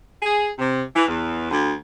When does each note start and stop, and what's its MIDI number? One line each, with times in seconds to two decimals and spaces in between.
0.23 0.50 68
0.59 0.83 48
0.96 1.07 52
1.07 1.49 40
1.51 1.72 38